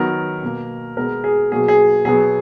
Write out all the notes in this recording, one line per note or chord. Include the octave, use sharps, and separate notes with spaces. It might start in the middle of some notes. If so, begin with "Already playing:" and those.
Already playing: D#3 F#3 B3 A#4
B2 A#3
B2 G#3 B3 A#4
G#4
B2 F#3 A#3 G#4
G#4
B2 F#3 B3 G#4